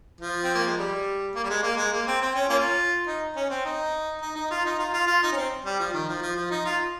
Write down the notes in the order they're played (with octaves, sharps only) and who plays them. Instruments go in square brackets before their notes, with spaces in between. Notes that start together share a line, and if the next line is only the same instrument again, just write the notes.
[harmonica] F3
C4
A#3
G#3
G3
A#3
G3
G#3
A#3
G#3
A#3
C4
C4
C#4
A#3 C#4 F4
D#4
C#4
C4
D#4
D#4
D#4
F4
D#4
F4
F4
F4
D#4
C#4
C4
G3
F3
D#3
F3
F3
F3
D#4
F4